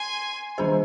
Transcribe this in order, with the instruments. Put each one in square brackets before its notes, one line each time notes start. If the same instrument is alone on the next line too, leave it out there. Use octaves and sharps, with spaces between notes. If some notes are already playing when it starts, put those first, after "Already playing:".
Already playing: [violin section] G#5 C6
[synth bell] D#3 G3 D4 G#4 C5